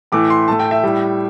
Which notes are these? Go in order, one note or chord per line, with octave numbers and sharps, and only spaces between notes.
A2 E3 A3 D6
C6
A2 A3 A5
G5
E5
A2 G3